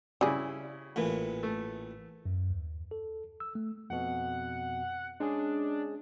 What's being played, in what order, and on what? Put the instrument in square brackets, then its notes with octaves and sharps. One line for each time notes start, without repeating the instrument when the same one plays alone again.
[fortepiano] C#3 E4 [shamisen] G3 G#4
[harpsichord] A1 A#2 E3
[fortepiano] A3
[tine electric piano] F#2
D#2
A4
E6
A3
[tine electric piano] F2 B2 [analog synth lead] F#5
[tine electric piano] G#3 C#4 G#4 [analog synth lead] D4